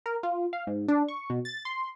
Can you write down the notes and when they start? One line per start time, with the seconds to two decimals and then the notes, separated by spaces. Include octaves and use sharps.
0.06 A#4
0.23 F4
0.53 F5
0.67 G#2
0.88 D4
1.08 C#6
1.30 B2
1.45 A6
1.65 C6